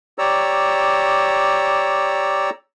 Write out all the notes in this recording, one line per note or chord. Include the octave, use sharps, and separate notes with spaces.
G4 C#5 D5 A#5 E6